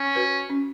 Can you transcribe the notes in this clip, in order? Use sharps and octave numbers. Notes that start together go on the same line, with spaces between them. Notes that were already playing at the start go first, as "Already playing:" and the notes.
Already playing: C#4
F#4 B4
C#4